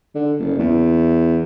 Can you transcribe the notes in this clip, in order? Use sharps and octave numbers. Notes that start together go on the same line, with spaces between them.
D3
F#1
E2